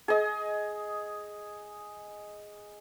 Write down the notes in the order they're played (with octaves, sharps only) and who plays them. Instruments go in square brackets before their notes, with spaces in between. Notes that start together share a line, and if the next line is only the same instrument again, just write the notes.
[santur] G#4 D#5